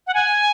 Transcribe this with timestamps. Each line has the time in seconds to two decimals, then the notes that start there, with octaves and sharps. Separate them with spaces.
0.07 F#5
0.14 G#5